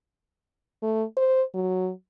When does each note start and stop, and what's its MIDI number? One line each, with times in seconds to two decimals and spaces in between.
0.83 1.04 57
1.17 1.43 72
1.54 1.91 54